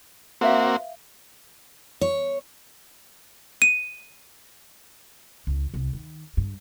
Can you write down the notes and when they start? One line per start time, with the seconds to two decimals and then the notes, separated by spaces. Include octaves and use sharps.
0.41 A#3 C4 F#4 B4 E5 F5
2.01 C#5
3.62 D#7
5.47 C#2
5.74 C2
5.93 D#3
6.37 G2